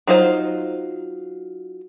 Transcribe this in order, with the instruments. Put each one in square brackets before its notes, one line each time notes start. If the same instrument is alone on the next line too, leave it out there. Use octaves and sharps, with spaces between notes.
[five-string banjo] F#3 D#4 F4 C5